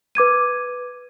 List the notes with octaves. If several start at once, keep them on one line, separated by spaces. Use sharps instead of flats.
B4 D6 G#6 D#7